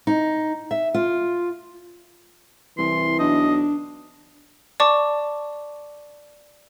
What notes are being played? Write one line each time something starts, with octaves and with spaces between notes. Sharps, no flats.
D#4
E5
F4
C2 E3 C6
B1 D4 D#5
D5 A5 C#6 D6